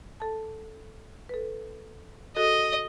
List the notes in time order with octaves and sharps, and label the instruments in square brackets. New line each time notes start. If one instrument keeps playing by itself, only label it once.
[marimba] A4 A5
A4 B4
[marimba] F#4 G#4 A4 [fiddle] D#5